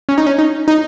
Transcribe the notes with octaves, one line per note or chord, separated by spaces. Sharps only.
C#4
D#4
C#4
D#4
D#4